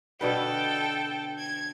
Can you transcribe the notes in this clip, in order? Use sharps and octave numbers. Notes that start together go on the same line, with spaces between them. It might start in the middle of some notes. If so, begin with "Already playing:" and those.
B2 D3 A4 B4 G5
G#6